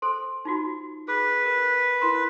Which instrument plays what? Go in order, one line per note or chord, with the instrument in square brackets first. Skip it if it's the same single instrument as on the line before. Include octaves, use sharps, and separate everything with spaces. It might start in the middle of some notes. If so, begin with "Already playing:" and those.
[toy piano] A4 C5 C6
D#4 F4 F#4
[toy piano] G#4 [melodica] B4
[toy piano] A#4
E4 A#4 C6